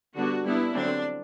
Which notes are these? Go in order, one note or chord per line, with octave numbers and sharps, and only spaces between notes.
D3 G3 B3 D4 F#4
G3 B3 D4 E4
D3 F#3 C4 D4